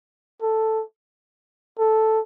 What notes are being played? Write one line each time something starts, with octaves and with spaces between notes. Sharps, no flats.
A4
A4